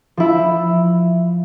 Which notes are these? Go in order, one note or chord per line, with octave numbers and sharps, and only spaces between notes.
F3 E4